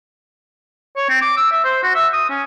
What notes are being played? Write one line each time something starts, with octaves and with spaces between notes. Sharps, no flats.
C#5
C4
D6
E6
E5
C5
F#4
E5
D#6
C#4